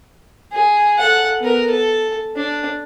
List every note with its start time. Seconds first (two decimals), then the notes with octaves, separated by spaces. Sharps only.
0.52 G#4
0.98 A4 F#5
1.40 B3 A#4
1.70 A4
2.36 D4